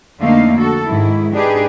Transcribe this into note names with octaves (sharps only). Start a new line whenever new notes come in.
F2 D3 A3 A#3 D#4 F5
F#4 A4
G#2 D#3 E4
D4 D#4 G4 G#4 B4